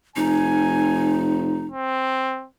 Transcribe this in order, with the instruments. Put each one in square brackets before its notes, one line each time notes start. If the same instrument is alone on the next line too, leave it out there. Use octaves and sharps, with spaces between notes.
[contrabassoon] F1 [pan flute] D#4 [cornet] G#5
[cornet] C4